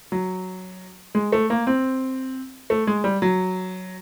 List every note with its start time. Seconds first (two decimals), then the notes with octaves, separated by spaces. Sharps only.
0.12 F#3
1.15 G#3
1.32 A3
1.50 A#3
1.67 C4
2.70 A3
2.87 G#3
3.04 G3
3.22 F#3